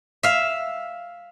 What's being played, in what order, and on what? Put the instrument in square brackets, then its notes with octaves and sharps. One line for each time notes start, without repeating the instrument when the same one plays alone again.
[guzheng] E5 F5